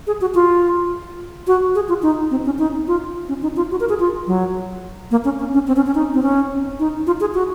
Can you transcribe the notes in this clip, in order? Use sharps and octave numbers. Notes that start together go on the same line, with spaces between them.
G#4
F#4
F4
F#4
G#4
F4
D#4
C4
C#4
D#4
F4
C#4
D#4
F4
F#4
A#4
G#4
F4
F#3
A#3
C#4
C#4
C#4
C4
C#4
C#4
D#4
C4
C#4
D#4
F4
G#4
F#4